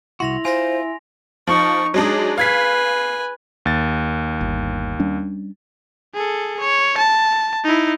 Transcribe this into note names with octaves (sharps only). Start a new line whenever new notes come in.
C2 E4 F#4 C6 A#6 F7
F4 C5 G#5 C6 A#6
F3 D#4 C#6
F#3 G#3 D4 D#4 G#4
B4 F5 G#5 G#6 B6
D#2 A6
G1
G3 C#4 D4
G#4 A4
C#5
A5
D#4 E4